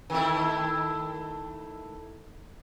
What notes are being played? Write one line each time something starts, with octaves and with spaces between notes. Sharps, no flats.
D#3 A3 E4